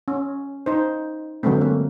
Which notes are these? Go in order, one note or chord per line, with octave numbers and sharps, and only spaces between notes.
C#4
D#4 C5
D3 F#3 G#3 A3 C4
A#3